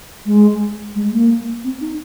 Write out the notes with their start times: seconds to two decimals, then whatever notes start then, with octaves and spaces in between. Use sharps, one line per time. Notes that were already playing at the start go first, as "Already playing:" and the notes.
0.26 G#3
0.95 G#3
1.12 A#3
1.64 C4
1.81 D#4